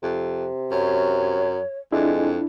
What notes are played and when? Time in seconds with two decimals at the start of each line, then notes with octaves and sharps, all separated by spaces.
0.03 F2 C3
0.71 F#2 C#5
1.92 F2 G#3 D4 E4